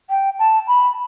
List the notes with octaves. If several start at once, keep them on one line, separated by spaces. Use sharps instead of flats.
G5
A5
B5